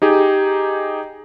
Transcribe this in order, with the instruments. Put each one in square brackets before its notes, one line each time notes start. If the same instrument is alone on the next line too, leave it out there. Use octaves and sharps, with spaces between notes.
[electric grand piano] D#4 G4 G#4